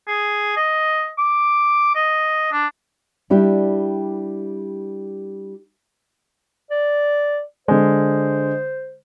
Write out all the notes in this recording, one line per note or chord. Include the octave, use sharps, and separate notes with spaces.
G#4
D#5
D6
D#5
D4
G3 D4 E4 G4
D5
D3 G#3 C5